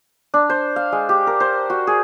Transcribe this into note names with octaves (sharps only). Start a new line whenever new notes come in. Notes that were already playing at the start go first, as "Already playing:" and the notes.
D4
C5
F5
G#3
G4
A#4
C5
F#4
G#4